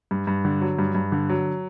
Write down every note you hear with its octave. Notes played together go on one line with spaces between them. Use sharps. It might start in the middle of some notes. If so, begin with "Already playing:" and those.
G2
G2
D3
F#3
G2
G2
D3
F#3